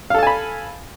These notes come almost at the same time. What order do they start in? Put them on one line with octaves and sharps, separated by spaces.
F5 A4 A5 G#5 B5